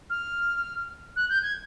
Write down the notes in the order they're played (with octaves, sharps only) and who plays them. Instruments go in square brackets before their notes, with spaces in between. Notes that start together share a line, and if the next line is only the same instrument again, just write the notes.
[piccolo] F6
F#6
G6
G#6